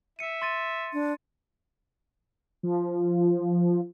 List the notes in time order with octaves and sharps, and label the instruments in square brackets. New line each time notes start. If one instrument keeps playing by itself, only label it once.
[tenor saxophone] E5 [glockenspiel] C#7 D#7
[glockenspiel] C6 A6 D#7
[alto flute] D4
[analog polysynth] F3